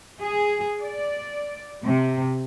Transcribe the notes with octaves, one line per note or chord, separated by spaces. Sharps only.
G#4
D5
C3